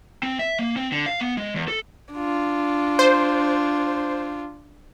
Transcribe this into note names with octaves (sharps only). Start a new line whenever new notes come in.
C4
E5
A#3
C4
D3
F5
B3
G#3
E2
A4
D4 F4
C5